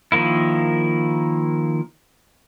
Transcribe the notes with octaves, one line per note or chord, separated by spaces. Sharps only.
D#3 F3 A#3 E4